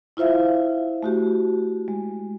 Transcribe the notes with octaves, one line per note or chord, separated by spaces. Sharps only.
E4 F4 C5 E5 F5
A3 F#4 G4
G#3